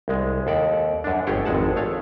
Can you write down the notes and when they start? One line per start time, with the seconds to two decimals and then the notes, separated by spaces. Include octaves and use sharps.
0.08 C2 G#3
0.47 D#2 A4 D5
1.04 F#2 D4
1.27 G1 A3 G4 G#4 C#5 G5
1.45 G#1 F2 G#3 F#5 A5
1.77 A3 C#5 F5